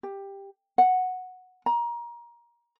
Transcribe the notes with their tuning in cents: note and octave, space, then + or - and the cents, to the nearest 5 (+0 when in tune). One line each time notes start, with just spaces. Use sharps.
G4 +10
F#5 -5
A#5 +25